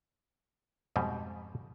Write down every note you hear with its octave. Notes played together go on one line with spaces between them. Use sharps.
F2 G#2 B2 G3